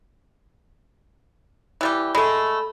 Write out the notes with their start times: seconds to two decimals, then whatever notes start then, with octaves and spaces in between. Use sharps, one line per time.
1.81 E3 G3 G4
2.15 G#3 A3 A4 B5